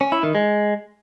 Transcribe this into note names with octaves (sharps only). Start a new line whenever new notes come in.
C#4
E4
D#3
G#3